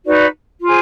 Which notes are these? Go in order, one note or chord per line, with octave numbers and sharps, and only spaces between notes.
D#4 F#4 B4 D5
F4 G#4 C5